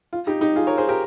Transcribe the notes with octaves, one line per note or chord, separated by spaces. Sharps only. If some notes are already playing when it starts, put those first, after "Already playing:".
F4
D#4 G4
D#4 G4
F4 G#4
A#4 C#5
G#4 C5
G4 A#4